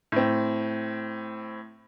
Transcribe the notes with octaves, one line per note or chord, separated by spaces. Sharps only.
A2 C4